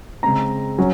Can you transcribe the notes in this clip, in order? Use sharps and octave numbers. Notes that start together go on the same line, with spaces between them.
C#3 G#3 C4 A#5
F#3 C#4